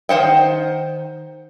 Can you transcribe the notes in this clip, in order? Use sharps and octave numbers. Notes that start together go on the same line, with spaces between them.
D#3 C5 F#5 G5